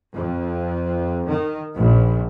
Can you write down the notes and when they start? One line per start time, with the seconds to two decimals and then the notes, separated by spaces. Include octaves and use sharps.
0.12 F2
1.27 D#3
1.76 A#1